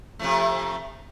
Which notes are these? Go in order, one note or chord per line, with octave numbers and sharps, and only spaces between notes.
C3 F3 A3